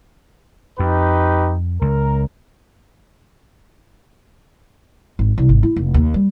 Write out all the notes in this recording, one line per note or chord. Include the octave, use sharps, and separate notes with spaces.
F2 D#4 G4 B4
C#2 A#4
G#1
C2
G#1
E4
F1
D#2
G3